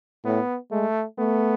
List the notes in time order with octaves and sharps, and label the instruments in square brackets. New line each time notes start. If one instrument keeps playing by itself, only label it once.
[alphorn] A2 [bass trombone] B3
[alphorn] G#3 [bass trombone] A3
[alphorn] A3 [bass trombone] B3